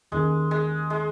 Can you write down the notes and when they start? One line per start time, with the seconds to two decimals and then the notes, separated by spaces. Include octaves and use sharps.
0.12 D#2 D#3 G#3 C#4 A#4
0.51 G#3
0.90 G#3